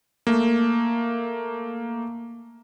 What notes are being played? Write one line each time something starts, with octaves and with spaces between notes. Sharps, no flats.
A3 A#3